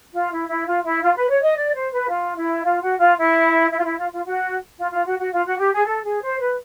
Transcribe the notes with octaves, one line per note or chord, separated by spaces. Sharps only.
F4
E4
E4
F4
E4
F4
B4
C#5
D#5
D5
C5
B4
F4
E4
F4
F#4
F4
E4
E4
F4
E4
F4
F4
F#4
F4
F4
F#4
F#4
F4
F#4
G4
G#4
A4
G#4
C5
B4